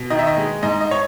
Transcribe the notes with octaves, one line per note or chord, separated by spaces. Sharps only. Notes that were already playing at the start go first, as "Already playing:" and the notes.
Already playing: B2
D#3 D#5
E5
D#5
G#3
G#2 D#5
D#5
C#5